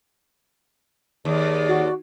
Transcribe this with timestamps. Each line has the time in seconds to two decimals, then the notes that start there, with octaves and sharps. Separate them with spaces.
1.25 D#2 G#4 D5
1.69 F#4